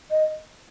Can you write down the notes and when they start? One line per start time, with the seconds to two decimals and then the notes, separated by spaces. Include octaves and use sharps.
0.10 D#5